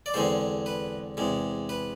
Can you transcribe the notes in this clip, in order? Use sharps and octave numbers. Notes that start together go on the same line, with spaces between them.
D5
E2 D3 G#3 C4 C5
B4
E2 C3 G#3
B4